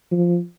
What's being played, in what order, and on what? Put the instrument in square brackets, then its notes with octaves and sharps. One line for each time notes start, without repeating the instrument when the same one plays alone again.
[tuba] F3